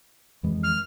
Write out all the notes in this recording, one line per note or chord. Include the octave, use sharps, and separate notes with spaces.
F2 E3 G#3
F6